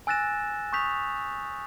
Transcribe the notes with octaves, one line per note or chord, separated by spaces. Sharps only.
G#5 E6 F#6 A6 A#6 E7
C#6 D#6 G6 B6 F7